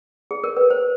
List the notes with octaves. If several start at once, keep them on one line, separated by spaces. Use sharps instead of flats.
G#4
A#4
B4
C5